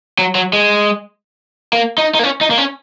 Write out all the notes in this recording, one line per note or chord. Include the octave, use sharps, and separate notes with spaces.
F#3
F#3
G#3
A#3
D#4
D#4
A#3
C#4
D#4
A#3
C#4